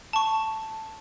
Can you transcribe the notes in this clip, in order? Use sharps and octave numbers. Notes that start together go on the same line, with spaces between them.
A5 C#6